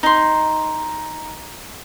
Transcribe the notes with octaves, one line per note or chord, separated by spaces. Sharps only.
D#4 C6